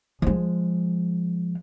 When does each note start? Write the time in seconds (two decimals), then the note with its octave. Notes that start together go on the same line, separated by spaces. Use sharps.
0.22 F3 G#3